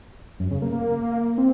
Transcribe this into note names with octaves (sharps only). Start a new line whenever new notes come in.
F#2
C#3
A#3
A#3
C4